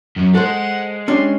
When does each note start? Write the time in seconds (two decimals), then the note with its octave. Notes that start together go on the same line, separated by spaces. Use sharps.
0.16 F#2 F#3
0.35 G#3 A4 C5 F#5
1.08 C#4 D4 G4 C6